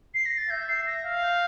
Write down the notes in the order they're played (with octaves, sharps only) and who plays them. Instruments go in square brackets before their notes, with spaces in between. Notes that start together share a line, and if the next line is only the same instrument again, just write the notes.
[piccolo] C7
A#6
A6
[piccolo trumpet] E5 [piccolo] G6
[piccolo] C7
A#6
[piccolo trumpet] F5
[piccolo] G6